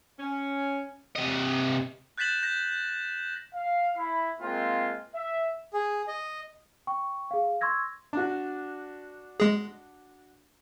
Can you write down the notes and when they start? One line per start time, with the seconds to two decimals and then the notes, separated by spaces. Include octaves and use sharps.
0.19 C#4
1.15 C3 D#5
2.18 F#6 G6 A6 B6 E7 F#7
2.43 G6 A#6
3.55 F5
3.98 E4 B5
4.41 G#3 A#3 C4 F4
5.15 E5
5.74 G#4
6.08 D#5
6.87 G5 C#6
7.31 G#4 F5
7.61 C6 C#6 E6 G#6 A#6
8.13 D4 F#4
9.40 G#3 G#4